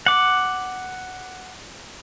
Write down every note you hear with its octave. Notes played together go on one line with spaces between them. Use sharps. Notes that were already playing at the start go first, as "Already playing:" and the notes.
F#5 D6